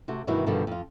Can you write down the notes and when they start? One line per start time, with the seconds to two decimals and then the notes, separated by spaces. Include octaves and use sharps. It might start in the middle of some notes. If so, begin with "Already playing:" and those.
0.08 C3 A3 F#4
0.27 G2 B2 D#3 E3 E4 F#4
0.46 G2 B2 D3 D#3 F3 G3
0.67 F2 F4